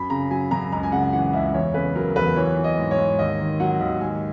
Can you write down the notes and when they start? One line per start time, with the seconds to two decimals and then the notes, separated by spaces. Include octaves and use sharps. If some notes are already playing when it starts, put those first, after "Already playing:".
Already playing: F#2 B5
0.10 C#3 A#5
0.31 F#3 G#5
0.51 F#2 A#5
0.72 C#2 A#5
0.83 G#5
0.92 C#3 F#5
1.13 E3 F#5
1.33 C#2 E5
1.54 E2 C#5
1.74 C#3 B4
1.95 F#3 A#4
2.16 E2 B4
2.36 E3 C#5
2.57 E3
2.64 D#5
2.78 G#2
2.91 C#5
2.98 G#2
3.19 D#2 D#5
3.39 D#3
3.60 F#3 F#5
3.80 D#2
4.01 G#2 G#5